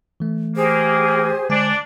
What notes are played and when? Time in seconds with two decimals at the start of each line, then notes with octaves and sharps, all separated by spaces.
0.20 E3 A3
0.57 A#3 G4 G#4 C5
1.49 D3 G#3 D4 G#5